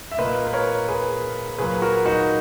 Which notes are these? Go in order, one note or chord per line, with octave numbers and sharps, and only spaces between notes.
E5
A#2 A#3 B4 D#5
B4
A#4 C#5
G#4 B4
A#2 F#3 A#3 G#4 B4
F#4 A#4
D#4 F#4